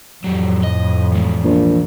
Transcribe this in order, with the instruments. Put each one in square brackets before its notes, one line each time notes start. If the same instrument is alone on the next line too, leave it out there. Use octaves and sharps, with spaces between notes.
[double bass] F2 A2 [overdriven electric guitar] F#3 G4
[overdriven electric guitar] D#5
E3 G#3
[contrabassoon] A#1